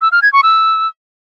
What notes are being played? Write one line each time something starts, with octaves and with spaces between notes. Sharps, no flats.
E6
F6
G#6
C#6
E6